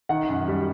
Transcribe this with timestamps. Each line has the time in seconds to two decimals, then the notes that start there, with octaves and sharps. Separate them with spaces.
0.09 D#3 F#5
0.29 F#2
0.48 G3